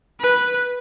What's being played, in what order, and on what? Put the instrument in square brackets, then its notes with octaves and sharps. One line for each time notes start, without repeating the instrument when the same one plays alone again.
[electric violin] B4